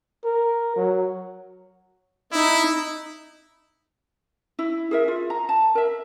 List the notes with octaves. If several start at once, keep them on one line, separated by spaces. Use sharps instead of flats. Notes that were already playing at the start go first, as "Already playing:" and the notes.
A#4
F#3
D#4 E4
E4
G#4 A#4 E5
F4
A#5
A5
A#4 E5